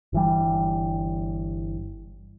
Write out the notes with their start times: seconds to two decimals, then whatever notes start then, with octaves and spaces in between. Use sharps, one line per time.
0.13 G1 E3 G3